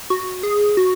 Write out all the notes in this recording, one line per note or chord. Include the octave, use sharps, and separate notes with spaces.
F#4
G#4
F#4